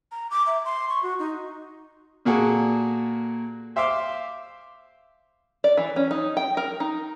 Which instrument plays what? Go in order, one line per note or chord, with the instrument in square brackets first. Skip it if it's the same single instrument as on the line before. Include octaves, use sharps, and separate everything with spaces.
[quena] A#5
D6
E5
C6
C#6
F#4
D#4
[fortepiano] A#2 A#3 F#4 G#4 A4
C5 E5 F5 C6 D6
[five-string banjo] D5
E3
C#4
D#4
G5
A#4
D#4